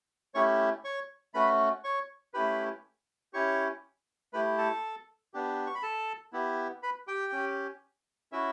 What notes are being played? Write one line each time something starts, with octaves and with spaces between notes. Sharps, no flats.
A3 C#4 E4 G4 C#5 C#6
C#5 C#6
A3 C#4 F#4 B4 B5
C#5 C#6
A3 C#4 E4 G4 B4 B5
C#4 E4 G4 C#5 C#6
A3 E4 G4 B4 B5
A4 A5
B3 D4 G4
C#6
B5
A4 A5
B3 E4 G4
B4 B5
G4 G5
C#4 G4
C#4 E4 F#4 E5